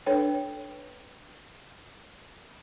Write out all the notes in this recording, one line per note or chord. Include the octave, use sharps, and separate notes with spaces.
D4 A4 B4 C#5 G5